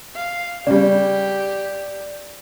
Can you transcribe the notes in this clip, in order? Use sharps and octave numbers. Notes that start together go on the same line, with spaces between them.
F5
C#3 G3 G4 D5